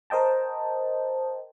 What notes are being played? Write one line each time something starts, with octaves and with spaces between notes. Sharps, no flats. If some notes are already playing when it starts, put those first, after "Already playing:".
A#4 C5 D#5 G5 A5